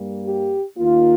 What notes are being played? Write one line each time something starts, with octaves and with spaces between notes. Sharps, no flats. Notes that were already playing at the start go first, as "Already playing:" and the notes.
Already playing: G2 G3 A#3
G4
D#2 D#3 A#3 F4